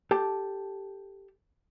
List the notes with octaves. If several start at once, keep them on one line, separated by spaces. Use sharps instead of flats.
G4 A4 A5